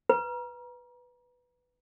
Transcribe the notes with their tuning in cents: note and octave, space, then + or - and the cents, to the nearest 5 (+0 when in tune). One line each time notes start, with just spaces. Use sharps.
B4 +0 A#5 +35